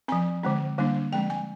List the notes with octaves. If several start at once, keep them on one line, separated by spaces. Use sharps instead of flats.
F3 C4 G#5
D3 G#3 C4
D3 G3 A#3 D4
F3 G#3 C4 G5
G#5